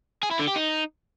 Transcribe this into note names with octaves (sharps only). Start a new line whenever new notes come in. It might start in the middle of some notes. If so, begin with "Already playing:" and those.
G#4
E4
D3
G4
D#4